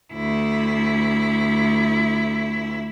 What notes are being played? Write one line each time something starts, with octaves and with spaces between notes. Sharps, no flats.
D2 E4